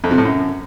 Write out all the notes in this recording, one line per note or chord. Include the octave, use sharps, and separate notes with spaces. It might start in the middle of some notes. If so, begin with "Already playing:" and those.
F2
C3
A2
F#2